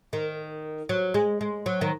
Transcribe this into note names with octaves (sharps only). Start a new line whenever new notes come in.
D#3
F#3
G#3
G#3
F#3
D#3